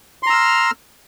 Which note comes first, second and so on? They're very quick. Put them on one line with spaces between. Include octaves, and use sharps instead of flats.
C6 A#5 E6 F6